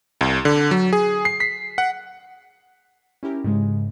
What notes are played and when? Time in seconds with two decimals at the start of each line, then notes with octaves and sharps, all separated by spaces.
0.21 C2
0.45 D3
0.71 F#3
0.93 G#4
1.25 C7
1.40 B6
1.78 F#5
3.23 C#4 E4 G4 A#4
3.44 G#2 C#3 G#3